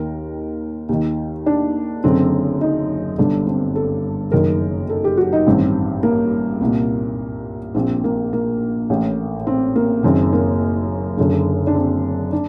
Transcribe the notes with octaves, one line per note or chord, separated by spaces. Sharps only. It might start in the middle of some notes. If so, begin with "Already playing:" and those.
Already playing: D#2 D#3 A#4
D#2 D#3
D4
F#1 F#2 D3 C4
D#4
G1 G2 D3 D4
C4
A4
F#1 F#2 D#3 A#4
A4
G4
F#4
D#4
A1 G2 D#3 C4
A#3
C2 A#2
A#1 A#2 C4
A#3
A#3
A1 A2
C4
A#3
F#1 F#2 D#3 C4
A#3
F#1 F#2 D3
D4
C4
D4